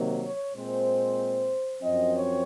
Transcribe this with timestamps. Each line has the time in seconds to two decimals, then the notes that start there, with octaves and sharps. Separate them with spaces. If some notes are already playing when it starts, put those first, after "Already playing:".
Already playing: C3 D#3 F#3 A#3
0.23 C#5
0.55 A#2 G#3 C4 C5
1.82 F#2 F3 C4 D#5
2.14 C#5